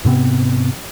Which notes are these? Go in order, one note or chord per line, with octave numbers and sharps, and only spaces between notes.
G#2 C3 B3 C4